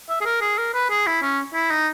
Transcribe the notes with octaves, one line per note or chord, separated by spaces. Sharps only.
E5
G#4
A#4
G#4
A#4
B4
G#4
E4
C#4
E4
D#4